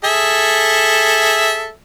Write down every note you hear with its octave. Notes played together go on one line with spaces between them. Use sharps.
G#4 A4 E5